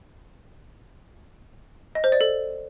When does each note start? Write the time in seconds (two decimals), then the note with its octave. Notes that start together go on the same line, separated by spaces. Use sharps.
1.95 D#5
2.04 C5
2.12 D5
2.21 A4